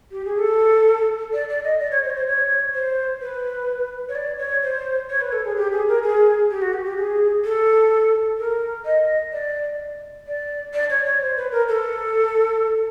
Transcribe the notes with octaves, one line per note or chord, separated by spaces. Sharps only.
G4
G#4
A4
D5
D5
D#5
D5
C#5
C5
C#5
C5
C#5
C5
B4
C#5
D5
C#5
C5
C#5
B4
A4
G#4
G4
G#4
A#4
G#4
G4
F#4
G4
G4
G#4
A4
A#4
D#5
D5
D5
D5
C#5
C#5
C5
B4
A#4
A4